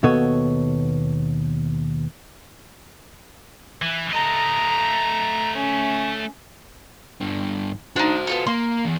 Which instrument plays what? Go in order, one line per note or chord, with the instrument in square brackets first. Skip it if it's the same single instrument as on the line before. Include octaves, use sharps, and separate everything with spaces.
[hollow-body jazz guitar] D#2 B2 B3 A4 C#5 D#5
[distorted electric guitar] E3
[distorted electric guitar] A3 D#5 [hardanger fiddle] A#5
[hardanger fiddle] C#4
[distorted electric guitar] G2 D3
[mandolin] D4 D#4 [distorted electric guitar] F#4 C5
[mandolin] B3 F4 A4
[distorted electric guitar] A#3 [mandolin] C6
[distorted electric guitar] E2